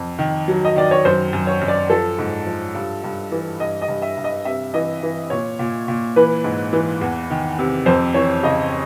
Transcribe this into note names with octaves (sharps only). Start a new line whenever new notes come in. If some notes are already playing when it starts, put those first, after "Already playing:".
Already playing: F2
D#3
F#3
D#5
D#3 D5
C#5
F#2 C5
F#2
C#5
F#2
D5
F3 A4
G#2
F3
G2
G2
E3
G2 D#5
D#5
G2
E5
G2
D#5
C3 E5
E3 D#5
E3
A#2 C#5
A#2
A#2
E3 B4
G#2
E3
E2
D#3
C3
F2 C5
E3 C#5
C#3 D#5